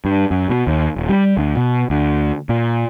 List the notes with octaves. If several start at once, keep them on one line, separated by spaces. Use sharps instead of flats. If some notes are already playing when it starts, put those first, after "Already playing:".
G2
F#2
B2
D#2
D#1
G3
D2
B2
D2
A#2